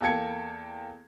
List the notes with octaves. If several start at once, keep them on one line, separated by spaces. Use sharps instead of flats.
E2 A#3 A4 G5 G#6 C#7